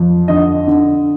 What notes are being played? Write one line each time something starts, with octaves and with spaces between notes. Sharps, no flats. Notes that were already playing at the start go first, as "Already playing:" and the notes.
Already playing: F2
D3 D#5
D3